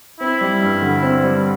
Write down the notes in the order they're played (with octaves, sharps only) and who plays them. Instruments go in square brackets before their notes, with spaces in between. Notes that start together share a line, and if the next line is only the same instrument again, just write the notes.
[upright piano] C4 [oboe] E4
[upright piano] G3
G2
D3
C4
G3